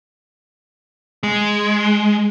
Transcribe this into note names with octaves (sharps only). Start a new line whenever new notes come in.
G#3